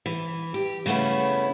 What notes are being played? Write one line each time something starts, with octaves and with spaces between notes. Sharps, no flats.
E3
G4
C#3 A3 B3 C#4 E4